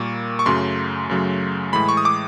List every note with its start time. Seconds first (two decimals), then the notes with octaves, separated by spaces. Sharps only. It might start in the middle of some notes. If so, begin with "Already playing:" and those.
Already playing: A#2 G3 A#3 C#6
0.39 C#6
0.46 F#2 C#3 F#3 A3 C6
1.09 F#2 C#3 F#3 A3
1.73 A2 E3 G#3 B5
1.89 C#6
1.97 D#6
2.05 D6